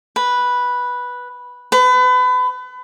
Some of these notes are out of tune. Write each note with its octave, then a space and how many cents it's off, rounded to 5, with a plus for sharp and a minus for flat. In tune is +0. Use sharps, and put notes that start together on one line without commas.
B4 -5
B4 +30